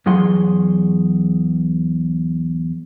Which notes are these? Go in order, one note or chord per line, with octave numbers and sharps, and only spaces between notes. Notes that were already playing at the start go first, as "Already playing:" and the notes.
E2 F#3 G#4 F#5 C6